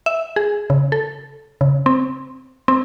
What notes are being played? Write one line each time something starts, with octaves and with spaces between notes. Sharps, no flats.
E5
G#4
C#3
A4
C#3
C4
C4